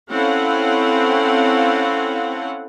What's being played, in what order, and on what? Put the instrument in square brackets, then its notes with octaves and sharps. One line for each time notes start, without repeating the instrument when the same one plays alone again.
[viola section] C4 C#4 E4 A4 F5 F#5